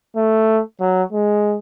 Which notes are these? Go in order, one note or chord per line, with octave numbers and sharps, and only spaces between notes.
A3
F#3
G#3